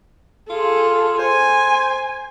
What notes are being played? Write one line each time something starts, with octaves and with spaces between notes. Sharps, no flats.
F4 G#4 A4
C5 G#5